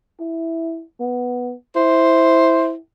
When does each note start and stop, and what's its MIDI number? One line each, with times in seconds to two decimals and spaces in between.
0.20 0.83 64
1.00 1.53 59
1.76 2.78 64
1.76 2.71 72